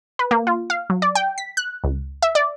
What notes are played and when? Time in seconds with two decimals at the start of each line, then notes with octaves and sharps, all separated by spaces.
0.19 B4
0.31 A#3
0.47 F4
0.70 F5
0.90 F#3
1.02 D5
1.15 G5
1.38 B6
1.57 F#6
1.84 C#2
2.22 E5
2.35 D5